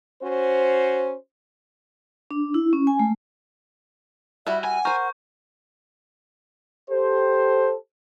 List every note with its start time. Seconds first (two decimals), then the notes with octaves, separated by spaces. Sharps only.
0.22 C#4 F#4 C5
2.31 D4
2.54 E4
2.73 C#4
2.87 G#5
2.99 A3
4.47 G3 E4 F#4 E5
4.64 F#5 G#5
4.85 A#4 C5 C#6 G6
6.90 G4 A4 C5